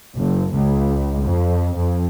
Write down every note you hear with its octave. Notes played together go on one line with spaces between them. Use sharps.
F#1
C#2
F2
F2